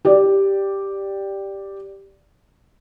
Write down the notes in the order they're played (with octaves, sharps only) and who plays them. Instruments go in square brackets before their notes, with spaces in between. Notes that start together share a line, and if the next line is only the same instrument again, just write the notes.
[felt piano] G4 D5